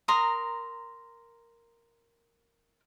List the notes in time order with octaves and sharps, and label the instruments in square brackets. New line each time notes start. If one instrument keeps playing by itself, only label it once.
[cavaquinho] A#4 A#5 C6 D#6